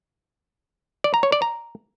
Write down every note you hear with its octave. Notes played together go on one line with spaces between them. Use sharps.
D5
A#5
C#5
D5
A#5